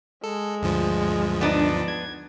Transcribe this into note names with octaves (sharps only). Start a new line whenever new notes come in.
G#3 A4
D2 G2 F3
B3 D4 D#4
G#6